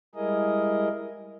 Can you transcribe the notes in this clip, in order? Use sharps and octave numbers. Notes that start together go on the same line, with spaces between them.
G3 G#3 E4 G#4 A#4 D#5